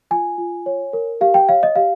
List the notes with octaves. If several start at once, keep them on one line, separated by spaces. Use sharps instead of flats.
F4 G#5
F4
C#5
A#4
G4 F5
G5
C#5 F5
D#5
G4 F5